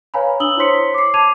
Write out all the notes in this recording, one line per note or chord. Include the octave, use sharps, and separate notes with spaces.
B4 C#5 F5 G#5 A#5 B5
D4 D#6 E6 F#7 G7
E4 C5 C#5 C6 B6 C#7
D6 C7
A5 D6 G#6 D#7 F7